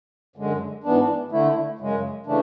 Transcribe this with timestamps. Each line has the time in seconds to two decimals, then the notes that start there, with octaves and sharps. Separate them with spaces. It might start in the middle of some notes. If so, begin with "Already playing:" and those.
0.36 F#2 D3 G#3
0.84 G#2 E3 B3 D4
1.31 D3 A3 E4
1.79 F#2 C#3 G#3
2.26 C#3 E3 A3 D4